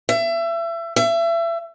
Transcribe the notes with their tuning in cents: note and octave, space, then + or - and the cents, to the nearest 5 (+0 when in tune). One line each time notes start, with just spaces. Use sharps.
E5 +30
E5 +30